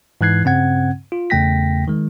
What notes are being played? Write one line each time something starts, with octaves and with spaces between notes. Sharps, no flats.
G#2 E3 F#6 G#6 C7
G2 C#3 C4 F#5 G#6
F4
E2 C#3 A3 G5 A#6 B6
D#3 G#3